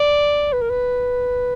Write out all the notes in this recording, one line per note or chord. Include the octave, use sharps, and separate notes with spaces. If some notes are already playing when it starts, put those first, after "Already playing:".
Already playing: D5
B4
A#4
B4